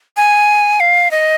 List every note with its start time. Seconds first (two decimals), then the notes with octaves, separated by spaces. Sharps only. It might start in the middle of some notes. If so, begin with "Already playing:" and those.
0.17 G#5
0.80 F5
1.11 D#5